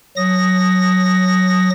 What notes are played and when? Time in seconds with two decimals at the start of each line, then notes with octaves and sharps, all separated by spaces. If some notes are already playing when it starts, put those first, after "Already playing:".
0.17 F#3 D#6 A#6